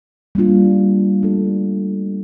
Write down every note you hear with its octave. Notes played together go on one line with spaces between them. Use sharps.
G3 A#3 D4 F4
A3 D4 F4 A4